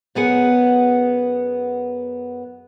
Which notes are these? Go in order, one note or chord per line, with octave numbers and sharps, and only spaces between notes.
F#2 B3 G#4 F#5